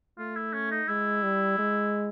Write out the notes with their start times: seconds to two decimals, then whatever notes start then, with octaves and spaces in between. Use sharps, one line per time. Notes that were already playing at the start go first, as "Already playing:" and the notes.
0.18 A3 F4
0.36 E4
0.53 C#4
0.71 D#4
0.88 G#3 E4
1.23 G3
1.59 G#3